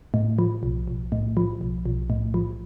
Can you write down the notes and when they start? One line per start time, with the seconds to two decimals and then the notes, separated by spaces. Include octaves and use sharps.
0.14 A2
0.39 F3
0.63 B1
0.88 B1
1.12 A2
1.37 F3
1.61 B1
1.86 B1
2.10 A2
2.34 F3